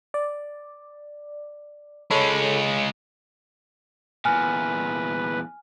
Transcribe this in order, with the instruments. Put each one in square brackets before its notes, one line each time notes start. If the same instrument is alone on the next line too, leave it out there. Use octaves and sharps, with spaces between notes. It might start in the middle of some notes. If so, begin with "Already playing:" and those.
[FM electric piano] D5
[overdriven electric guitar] G#3 C#4 [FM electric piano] A4 C#5 B5
[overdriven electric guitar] E2 A#2 [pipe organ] B4 [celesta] G#5 F6